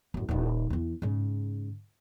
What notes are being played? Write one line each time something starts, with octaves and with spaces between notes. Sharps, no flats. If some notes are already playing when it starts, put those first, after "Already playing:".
A1 F#2
D#1 D#4
E2 E3
G#2 C#3